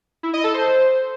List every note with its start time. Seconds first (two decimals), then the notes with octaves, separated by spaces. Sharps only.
0.23 E4
0.33 D#5
0.44 A4
0.54 C5